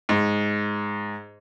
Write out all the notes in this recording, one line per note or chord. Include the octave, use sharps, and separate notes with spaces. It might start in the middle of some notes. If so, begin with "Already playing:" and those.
G#2